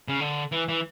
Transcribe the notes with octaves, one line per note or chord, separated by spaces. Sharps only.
C#3
D3
E3
E3